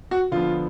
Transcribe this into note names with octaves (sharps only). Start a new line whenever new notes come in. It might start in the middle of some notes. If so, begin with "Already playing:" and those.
F#4
D3 F3 B3 F4